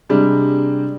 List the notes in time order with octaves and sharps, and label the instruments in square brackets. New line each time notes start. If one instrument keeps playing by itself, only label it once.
[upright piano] C3 G3 G#3 D4